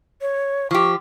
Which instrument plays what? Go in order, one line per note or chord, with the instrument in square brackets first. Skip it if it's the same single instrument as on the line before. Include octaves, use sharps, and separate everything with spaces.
[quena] C#5
[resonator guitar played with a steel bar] F3 G4 [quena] C#6